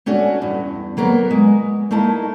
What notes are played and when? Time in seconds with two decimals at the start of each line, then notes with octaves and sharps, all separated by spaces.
0.06 A3 C#4 D4 F#4
0.42 E2 G2
0.97 F#3 A#3 B3 A#4
1.31 G#3
1.91 A3 A#3 D#4 E4 A5